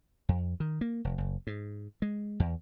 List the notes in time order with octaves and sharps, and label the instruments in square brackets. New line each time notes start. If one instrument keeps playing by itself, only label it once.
[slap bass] F2
D#3
A#3
F1
F#1
G#2
G#3
E2